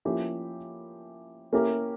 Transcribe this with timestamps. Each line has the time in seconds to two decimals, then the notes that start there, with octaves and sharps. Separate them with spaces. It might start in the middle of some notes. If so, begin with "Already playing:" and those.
0.05 F3 A#3 C#4 E4 G4
1.53 A#3 C#4 E4 G4 A#4